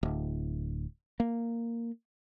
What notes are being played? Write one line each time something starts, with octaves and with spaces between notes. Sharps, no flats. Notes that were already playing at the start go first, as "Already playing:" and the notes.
D1
A#3